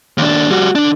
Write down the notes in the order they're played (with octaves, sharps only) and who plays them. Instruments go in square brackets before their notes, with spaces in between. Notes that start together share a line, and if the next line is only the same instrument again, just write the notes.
[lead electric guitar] D#2 D4
G3 F#4
D3 D4